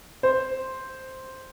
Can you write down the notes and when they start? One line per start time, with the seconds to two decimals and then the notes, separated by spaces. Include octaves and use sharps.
0.23 C5